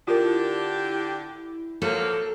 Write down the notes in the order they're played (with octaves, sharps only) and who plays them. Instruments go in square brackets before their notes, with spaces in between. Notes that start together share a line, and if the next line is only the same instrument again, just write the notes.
[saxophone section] D3 D4 G4 [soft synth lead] E4 [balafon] F4 A#4
[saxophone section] F3 F#3 A#3 [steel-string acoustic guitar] A4